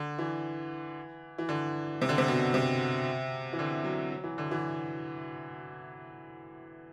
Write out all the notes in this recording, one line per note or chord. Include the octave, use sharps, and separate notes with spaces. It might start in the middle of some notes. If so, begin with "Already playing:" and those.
Already playing: D3
E3
E3
D3
C3
D3
C3
B2
C3
E3
D3
F#3
F#3
E3
D3
E3